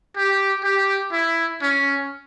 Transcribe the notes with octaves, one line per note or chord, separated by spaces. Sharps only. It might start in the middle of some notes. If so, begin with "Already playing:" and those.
G4
G4
E4
C#4